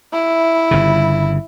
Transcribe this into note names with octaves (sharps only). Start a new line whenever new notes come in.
E4
G1 C#3